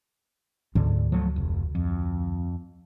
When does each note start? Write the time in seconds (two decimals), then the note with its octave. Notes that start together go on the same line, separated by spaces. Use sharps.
0.75 D2 G#2 D3
1.12 F3 F#3 A3
1.36 F1
1.75 F2